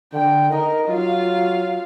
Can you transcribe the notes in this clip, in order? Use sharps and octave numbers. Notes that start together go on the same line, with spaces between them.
D3 G5
D#4 A#4 D#5
F#3 F4 F5